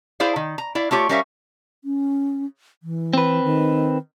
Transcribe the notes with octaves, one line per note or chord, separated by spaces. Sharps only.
E4 G#4 C5 D5 F5
D#3
A#5
E4 D5 F5
A3 F4 G4 C#5
G3 C#4 A#4 C#5 E5 F5
C#4
E3
C4 B4
D#3